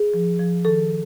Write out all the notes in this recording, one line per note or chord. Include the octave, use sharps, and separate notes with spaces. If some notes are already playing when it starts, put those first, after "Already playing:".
Already playing: G#4
F3
F3
D#3 A4